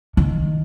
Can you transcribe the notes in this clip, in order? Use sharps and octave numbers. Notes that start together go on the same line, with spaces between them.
D#3